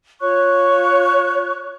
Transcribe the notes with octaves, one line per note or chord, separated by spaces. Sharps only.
F4 C#5 C#6 F#6